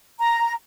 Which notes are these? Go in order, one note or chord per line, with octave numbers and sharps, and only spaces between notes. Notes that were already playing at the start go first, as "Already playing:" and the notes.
A#5